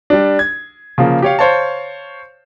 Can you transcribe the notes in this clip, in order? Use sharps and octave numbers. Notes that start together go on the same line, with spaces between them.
G3 D4
G#6
C#3 F3 A#3
G4 C#5 F5
C5 C#5 F5 A5